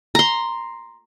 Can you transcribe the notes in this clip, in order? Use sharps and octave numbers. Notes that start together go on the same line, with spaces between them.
A#5 C6